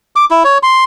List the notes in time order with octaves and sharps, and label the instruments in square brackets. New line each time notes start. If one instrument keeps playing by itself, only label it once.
[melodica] D6
E4
C#5
C6